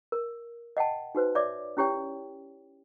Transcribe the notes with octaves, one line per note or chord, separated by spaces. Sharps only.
A#4
D#5 F#5 G5 A5
D#4 F#4 B4 C5
C#5 D5 E5 D6
C#4 E4 G4 C#5 G5